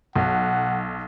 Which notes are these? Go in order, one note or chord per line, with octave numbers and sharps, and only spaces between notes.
B1 F#5